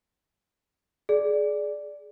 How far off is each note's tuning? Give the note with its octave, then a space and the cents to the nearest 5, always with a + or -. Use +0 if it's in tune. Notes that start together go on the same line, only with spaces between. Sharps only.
G#4 +20 D5 +0